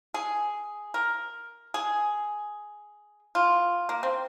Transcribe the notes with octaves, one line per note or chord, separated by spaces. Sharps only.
G#4
A#4
G#4
F4
A#3
C4